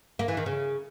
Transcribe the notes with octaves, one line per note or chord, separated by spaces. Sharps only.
A#3
E3
D#3
C#3